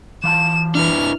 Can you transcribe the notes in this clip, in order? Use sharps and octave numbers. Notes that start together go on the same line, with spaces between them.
E3 F5 A5 E7
D4 E4 B4 F6